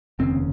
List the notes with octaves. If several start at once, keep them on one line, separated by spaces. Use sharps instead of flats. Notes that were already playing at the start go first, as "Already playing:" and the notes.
F1 D#2 C#3 C4